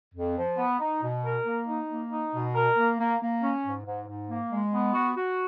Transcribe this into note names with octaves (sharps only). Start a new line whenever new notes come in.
F2
F3
B3
D#4
B2
A#4
A#3
D#4
A#3
D#4
B2
A#4
A#3
A#3
A#3
C#4
G#2
G#2
G#2
A#3
G#3
B3
F#4
F#4